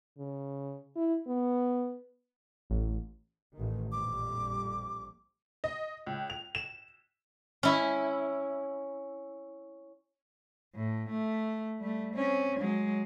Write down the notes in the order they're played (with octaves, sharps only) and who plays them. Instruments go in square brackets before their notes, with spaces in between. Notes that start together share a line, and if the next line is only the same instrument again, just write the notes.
[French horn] C#3
E4
B3
[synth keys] A1
[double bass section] A1 D#3
[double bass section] A#1 F2 G3 [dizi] D6
[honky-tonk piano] D#5
C#2
F7
E7
[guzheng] C#4 E4
[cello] A2
A3
G3 A3
C4 C#4
F#3 G#3